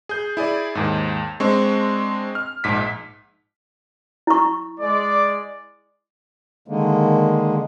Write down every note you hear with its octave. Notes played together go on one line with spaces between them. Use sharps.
G#4 G6
E4 G#4 D5
D#2 G#2
G#3 C4 D4 C#6
F6
A#1 G#2 B6
E4 C#6
G#3 D5
D3 D#3 G#3 A#3